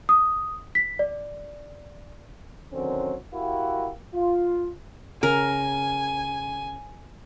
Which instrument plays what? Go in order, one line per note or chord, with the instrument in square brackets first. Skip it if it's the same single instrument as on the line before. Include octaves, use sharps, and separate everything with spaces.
[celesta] D#6
B6
D5
[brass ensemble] D3 D#3 F#3 C4 C#4
E4 F#4 G4 A#4 F5
F4
[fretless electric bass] C#3 [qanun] A#4 [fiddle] G#5